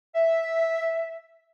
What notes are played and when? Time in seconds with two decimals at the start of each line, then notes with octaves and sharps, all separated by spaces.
0.15 E5